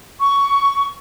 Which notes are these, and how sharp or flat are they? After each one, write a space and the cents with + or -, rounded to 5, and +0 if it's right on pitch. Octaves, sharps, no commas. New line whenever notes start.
C#6 +15